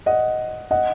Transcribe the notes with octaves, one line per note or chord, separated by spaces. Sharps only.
D#5 F#5
D#5 F#5